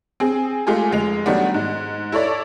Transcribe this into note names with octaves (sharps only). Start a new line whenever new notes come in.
C4 G#4
G#3 A3 F4 G4 G#4
F1 G#3 F7
D#3 F#3 G3 A3 B3 D4
G#2
E4 A4 C#5 D5